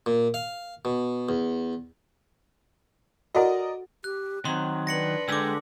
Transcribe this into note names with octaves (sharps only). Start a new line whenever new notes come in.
A#2
F5
B2
E2
F#4 A4 A#4 D5 D#5 F#5
G4 F#6
D#3 F#3 C4 C6
D4 B4 A#6 C#7 F#7
D3 G#3 G4 D6 E6